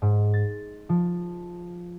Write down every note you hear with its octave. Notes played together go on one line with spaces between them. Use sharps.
G#2
A6
F3